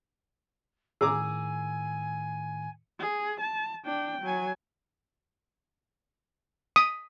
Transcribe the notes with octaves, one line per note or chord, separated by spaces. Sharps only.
A2 D#3 G#4 G#5 A#5 D6 E6
G#4
A5
D4 G5
F#3 G#5
D#6